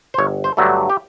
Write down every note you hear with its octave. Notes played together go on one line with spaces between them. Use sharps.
C5
G1 C#5
C5
G2 D3 F#3 A3
G4